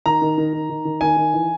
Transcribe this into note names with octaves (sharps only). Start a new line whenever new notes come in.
D#3 A#5
D#3
D#3
D#3
D#3
D#3
D#3 G#5
D#3
E3